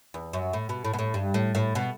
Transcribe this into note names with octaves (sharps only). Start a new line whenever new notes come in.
E2
F#2
A2
B2
A2
B2
A2
G2
A2
A2
B2